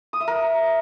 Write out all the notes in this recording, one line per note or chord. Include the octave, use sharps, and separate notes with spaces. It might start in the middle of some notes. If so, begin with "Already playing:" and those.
D#6
E5
A#4